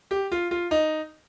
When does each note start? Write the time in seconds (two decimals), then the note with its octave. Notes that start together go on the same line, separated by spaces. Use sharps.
0.11 G4
0.32 F4
0.51 F4
0.71 D#4